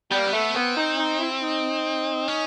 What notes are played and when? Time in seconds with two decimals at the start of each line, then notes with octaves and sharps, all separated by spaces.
0.11 G3 B3
0.19 A#3
0.26 B3
0.33 A3
0.54 B3 C4
0.77 D#4
0.98 D#4
1.19 E4
1.31 E4
1.42 D#4
2.28 C#4